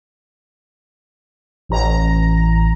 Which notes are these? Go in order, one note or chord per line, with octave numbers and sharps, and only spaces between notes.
A1 A#5